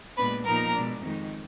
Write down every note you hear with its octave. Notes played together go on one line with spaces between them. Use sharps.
A#2 G#3 B3 D4 B4 B5
A#2 F3 B3 D#4 A#4 A#5
B2 G#3 D4
F2 D#3 G#3 D#4